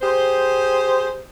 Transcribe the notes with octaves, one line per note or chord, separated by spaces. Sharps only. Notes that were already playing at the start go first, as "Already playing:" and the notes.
G4 G#4 C5